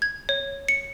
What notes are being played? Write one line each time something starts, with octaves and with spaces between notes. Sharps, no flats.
G#6
C#5
C#7